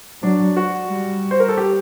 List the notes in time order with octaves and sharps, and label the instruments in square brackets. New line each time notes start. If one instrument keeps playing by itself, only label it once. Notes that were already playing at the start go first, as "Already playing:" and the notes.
[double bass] F#3 [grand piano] D4
[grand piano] F#4
[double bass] G3
[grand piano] C5
A#4
A4
G4